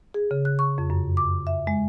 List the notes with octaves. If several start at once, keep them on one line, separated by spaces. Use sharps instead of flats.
G#4
C#3
F#6
C#6
F2
F#2
D6
E5
G#3